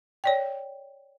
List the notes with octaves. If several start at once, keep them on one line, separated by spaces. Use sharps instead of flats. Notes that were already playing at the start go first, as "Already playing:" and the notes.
C#5 D5 G5